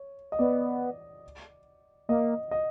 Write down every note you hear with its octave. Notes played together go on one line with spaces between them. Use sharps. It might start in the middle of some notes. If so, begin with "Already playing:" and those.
Already playing: C#5
D#5
B3 D5
A#3 D#5
D#5